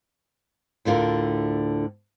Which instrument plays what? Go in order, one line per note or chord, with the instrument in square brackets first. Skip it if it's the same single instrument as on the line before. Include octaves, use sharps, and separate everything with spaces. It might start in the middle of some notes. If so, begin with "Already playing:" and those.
[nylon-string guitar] D2 A2 D3 F4 A#4